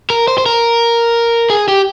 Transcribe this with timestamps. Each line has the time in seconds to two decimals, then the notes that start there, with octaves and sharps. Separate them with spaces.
0.10 A#4
0.28 C5
0.38 C5
0.46 A#4
1.50 G#4
1.68 G4